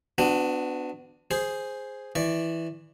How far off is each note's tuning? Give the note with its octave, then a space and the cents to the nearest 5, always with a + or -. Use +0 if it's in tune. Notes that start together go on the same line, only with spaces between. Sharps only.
B3 +30 D4 +10 F#4 -20
G#4 +0 C5 +0
E3 +0 D5 +5 C#6 -15